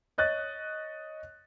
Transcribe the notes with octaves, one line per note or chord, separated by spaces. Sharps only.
C#5 D#5 F#6 A6